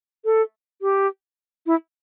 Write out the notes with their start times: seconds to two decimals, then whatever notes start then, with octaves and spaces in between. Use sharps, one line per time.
0.25 A4
0.82 G4
1.66 E4